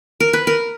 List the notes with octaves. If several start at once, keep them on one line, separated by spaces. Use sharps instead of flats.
A#4
B4
A#4